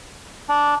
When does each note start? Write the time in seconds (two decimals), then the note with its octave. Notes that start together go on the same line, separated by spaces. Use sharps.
0.49 D4